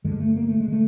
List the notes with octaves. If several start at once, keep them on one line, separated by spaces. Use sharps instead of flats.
G2 D3 G#3
A3
A#3
A3
G#3
D3 A3